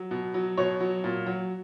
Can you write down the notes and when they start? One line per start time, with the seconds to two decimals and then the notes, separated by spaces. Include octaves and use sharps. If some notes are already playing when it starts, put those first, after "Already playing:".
Already playing: F#3
0.11 B2
0.34 F#3
0.57 B2 C#5
0.80 F#3
1.04 A#2
1.26 F#3